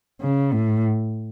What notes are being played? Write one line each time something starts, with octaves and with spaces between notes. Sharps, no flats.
C#3
A2